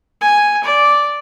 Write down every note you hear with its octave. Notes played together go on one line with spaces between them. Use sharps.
G#5
D5